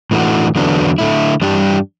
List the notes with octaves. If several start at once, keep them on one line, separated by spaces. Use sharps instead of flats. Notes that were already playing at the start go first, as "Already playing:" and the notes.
A2 E3 A3 D4 F#4
E2 D3 F#3 B3 D4
D3 A3 E4
G2 E3 G3 D4 G4